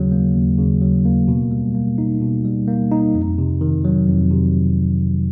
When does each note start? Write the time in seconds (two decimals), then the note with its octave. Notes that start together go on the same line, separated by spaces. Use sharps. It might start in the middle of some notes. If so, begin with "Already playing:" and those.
Already playing: D#2 C#3 F#3
0.12 A#3
0.35 D#2
0.58 C#3
0.81 F#3
1.05 A#3
1.28 B2
1.51 G3
1.75 A#3
1.98 D#4
2.22 B2
2.45 G3
2.68 A#3
2.91 D#4
3.15 F2
3.38 C3
3.61 D#3
3.85 F#3
4.07 F2
4.31 C3